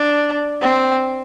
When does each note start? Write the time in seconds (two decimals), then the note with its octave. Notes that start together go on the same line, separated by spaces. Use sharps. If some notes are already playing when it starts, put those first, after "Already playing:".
Already playing: D4
0.62 C4